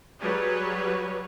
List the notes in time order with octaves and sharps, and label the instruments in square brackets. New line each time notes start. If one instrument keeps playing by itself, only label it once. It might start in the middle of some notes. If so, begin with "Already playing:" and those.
[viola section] F#3 G3 G#4 B4 C#5